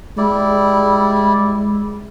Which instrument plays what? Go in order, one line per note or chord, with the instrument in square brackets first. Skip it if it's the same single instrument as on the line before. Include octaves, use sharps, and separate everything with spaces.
[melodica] G3 E4 D5 [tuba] G#3